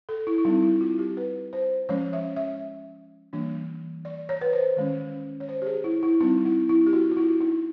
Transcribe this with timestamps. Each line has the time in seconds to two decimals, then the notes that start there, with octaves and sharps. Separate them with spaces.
0.09 A4
0.27 E4
0.38 E4
0.45 G3 C4 D#4
0.62 E4
0.81 F4
0.99 G4
1.17 B4
1.53 C5
1.89 F3 G#3 C#4 C#5
2.13 E5
2.36 E5
3.33 E3 G3 A#3 D4
4.05 D5
4.29 C#5
4.41 B4
4.53 C5
4.77 D#3 G#3 C#4
5.40 C#5
5.49 C5
5.62 G4
5.66 G#4
5.84 E4
6.03 E4
6.21 G3 C4 D#4
6.45 E4
6.69 E4
6.87 G4
6.93 F#4
7.11 F4
7.17 E4
7.41 D#4